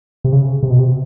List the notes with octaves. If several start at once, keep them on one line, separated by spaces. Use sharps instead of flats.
C3
C#3
C3
B2
C3